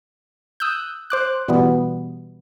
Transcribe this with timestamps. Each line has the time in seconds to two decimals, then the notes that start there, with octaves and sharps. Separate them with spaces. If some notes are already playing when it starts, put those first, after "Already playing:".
0.60 D#6 E6 F#6 G6
1.10 C5 D6 F#6
1.48 B2 E3 G3 B3